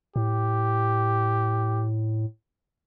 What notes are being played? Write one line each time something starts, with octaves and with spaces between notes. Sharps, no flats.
A2 G4